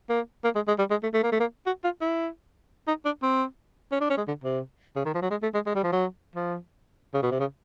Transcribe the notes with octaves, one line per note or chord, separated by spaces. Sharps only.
A#3
A#3
G#3
G#3
G3
G#3
A3
A3
A#3
A3
A#3
F#4
F4
E4
D#4
D4
C4
C#4
D4
C#4
G#3
D3
C3
C#3
D#3
F3
F#3
G#3
A3
G#3
G#3
G3
F3
F#3
F3
C#3
B2
C3
C#3